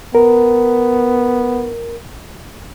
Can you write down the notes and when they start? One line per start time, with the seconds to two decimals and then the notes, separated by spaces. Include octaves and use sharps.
0.15 B3 A#4